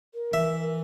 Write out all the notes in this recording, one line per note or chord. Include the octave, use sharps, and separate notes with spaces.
A#4
E3 E5